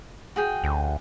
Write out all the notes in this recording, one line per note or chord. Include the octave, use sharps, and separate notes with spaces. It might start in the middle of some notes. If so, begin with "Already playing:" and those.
F#4 G#4 G5
D2